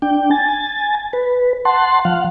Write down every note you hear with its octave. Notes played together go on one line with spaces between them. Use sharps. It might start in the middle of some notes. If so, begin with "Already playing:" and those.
D4 G5
G#5 A6
B4
F#5 A5 C6
F3 F5 F#5